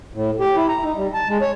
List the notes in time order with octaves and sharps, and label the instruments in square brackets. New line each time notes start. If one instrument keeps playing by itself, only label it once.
[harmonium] A2
G4
E4
A#5
D#4
G3
A5
G#3
C#5